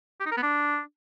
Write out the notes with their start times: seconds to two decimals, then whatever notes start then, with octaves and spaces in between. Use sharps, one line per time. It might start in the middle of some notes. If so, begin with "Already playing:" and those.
0.21 G4
0.26 D#4
0.32 A#4
0.37 B3
0.43 D4